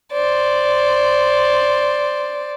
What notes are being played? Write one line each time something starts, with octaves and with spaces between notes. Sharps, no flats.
C5 D5